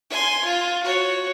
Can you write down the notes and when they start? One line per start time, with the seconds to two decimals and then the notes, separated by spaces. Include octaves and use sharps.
0.10 G#5 C6
0.44 F4
0.83 F#4 C#5